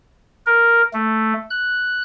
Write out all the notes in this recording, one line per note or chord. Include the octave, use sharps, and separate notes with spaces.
A#4
A3
F#6